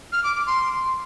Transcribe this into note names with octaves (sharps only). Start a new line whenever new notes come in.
F6
D6
D6
C6